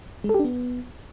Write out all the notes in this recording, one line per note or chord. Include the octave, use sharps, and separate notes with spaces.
G#3
A4
G4
D4
B3